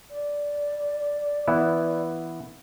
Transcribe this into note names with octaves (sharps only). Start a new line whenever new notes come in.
D5
E3 B3 E4